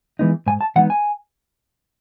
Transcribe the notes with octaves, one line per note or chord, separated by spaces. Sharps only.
E3 G#3 B3 D#4
G#2 G#5
A5
E3 G#3 B3 D#4 F#5
G#5